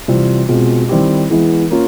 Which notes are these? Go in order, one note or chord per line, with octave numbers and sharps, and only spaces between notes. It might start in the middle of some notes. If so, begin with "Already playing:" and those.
C3 E3 G3 C4 F4
B2 G#3 C4 F4
D#3 G3 C4 E4 G4
E3 G#3 B3 E4
A#3 C#4 F4